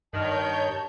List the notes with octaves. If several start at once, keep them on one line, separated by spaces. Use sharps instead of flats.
G2 D#3 C#5 A5 G6